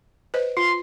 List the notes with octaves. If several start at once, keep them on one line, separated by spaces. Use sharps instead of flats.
B4 C5 D#5
F4 C6